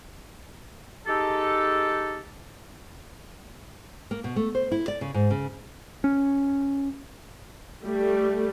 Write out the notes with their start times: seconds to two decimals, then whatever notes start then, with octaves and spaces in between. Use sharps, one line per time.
1.07 G#3 D#4 G4 A4
4.11 A#3
4.24 B2
4.36 A3
4.55 C5
4.72 E4
4.88 D5
5.01 C#3
5.14 G#2
5.30 C#3
6.04 C#4
7.83 G3 A3